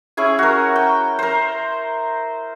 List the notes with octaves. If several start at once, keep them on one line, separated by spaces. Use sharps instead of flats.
C#4 E4 G#4 G#5
F#4 A#4
G5
A#4 C5